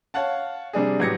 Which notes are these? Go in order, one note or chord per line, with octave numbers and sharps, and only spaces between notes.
C#5 F5 F#5 A5
C3 G3 D4 G#4
A1 F#3 G4 G#6 A#6 C#7